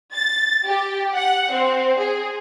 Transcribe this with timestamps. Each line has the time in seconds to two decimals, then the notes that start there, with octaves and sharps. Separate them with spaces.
0.14 A6
0.66 G4
1.15 F#5
1.50 C4
1.98 G#4